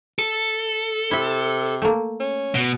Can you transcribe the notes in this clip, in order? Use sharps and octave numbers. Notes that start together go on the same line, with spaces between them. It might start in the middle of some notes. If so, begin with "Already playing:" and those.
A4
C3 E4 E5
A3 A#3
C#4
B2